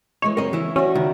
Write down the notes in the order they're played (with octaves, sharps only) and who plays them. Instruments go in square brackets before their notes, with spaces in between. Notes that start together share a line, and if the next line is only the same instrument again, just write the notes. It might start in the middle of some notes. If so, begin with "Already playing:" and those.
[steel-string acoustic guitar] E3 G#3 D#5 [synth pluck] C#5
[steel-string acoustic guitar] F#2 C#3 C4 [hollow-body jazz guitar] A#4 D#5
[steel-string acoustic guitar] C#3 [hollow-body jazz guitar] E3 E4
[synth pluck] C#4 [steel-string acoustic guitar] F#4 D5 E5
[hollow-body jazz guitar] C#2 D#3